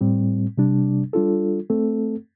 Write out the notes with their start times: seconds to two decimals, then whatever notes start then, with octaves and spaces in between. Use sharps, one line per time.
0.01 A2 G3 C4
0.58 C3 G3 D4
1.13 G3 D4 F4 A4
1.70 A3 C4 A4